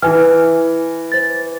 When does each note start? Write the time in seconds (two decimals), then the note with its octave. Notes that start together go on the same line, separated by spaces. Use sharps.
0.02 E3 E4 G#5 F6
1.12 C5 A6